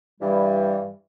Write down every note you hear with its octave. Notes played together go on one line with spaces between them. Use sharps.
G2 E3 G3